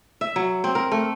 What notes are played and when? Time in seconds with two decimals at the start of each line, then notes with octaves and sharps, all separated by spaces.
0.21 E5
0.36 F#3
0.64 C4
0.75 A#4
0.92 A3